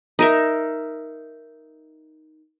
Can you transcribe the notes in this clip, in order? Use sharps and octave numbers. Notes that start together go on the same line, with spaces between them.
D#4 A#4 E5